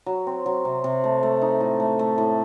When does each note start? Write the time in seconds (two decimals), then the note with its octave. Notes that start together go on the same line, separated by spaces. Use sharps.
0.06 F#3
0.27 C4
0.46 F#3
0.65 C3
0.84 C3
1.04 A3
1.23 A3
1.42 D#4
1.60 A2
1.80 A3
1.99 A3
2.18 A2